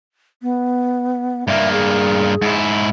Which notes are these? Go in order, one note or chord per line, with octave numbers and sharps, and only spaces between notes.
B3
G2 A#3 E5
G#4
G#2 E4